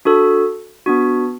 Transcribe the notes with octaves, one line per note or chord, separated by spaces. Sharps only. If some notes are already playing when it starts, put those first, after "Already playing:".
D4 F#4 A4
B3 D4 F#4